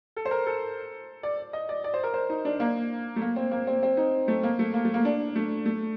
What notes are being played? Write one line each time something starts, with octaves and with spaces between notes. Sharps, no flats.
A4
C5
A#4
A4
D5
D#5
D5
D5
C5
A#4
C5
D#4
D4
A#3
A3
A#3
C4
A#3
C4
C4
D#4
A3
A#3
A3
A#3
A3
A#3
D4
A3
A3